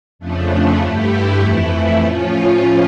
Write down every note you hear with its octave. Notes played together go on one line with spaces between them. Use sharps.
F2 C#3 F3 A3 D4
G2 D3 A3 E4 G4
F2 E3 A3 E4
A2 F3 C#4 F4